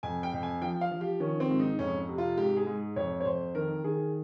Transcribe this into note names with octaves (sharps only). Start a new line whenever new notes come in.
F2 G#5
G5
F2
G#5
F3 G5
F5
F3
G4
D#3 C#4
C4
G#2
D#4
F2 C#4
C3
F4
G#2 G4
G#4
G#2
F2 C#5
C#5
F2 C5
D#3 A#4
D#3 G#4